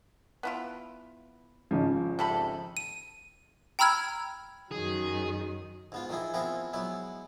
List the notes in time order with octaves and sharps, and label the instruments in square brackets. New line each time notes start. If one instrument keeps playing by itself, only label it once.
[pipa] B3 E4 F4
[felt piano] G#1 C#3 F3
[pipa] C3 A4 B5
[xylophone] D#7
G5 A#5 B5 E6 F6 G#6
[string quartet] F#2 D#3 F#3 [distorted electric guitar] G#4
[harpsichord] G#2 B3 F4
D#3 F3 D#4 E4 G#4
F3 B3 C4 E4 G#4 A#4
F#3 G#3 B3 E4